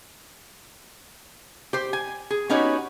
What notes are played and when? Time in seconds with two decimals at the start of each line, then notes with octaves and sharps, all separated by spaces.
1.73 G4 C5
1.93 G#5
2.31 G#4
2.49 B3 C#4 D#4 F#4 G4 C#5